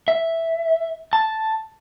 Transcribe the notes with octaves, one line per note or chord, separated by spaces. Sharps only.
E5
A5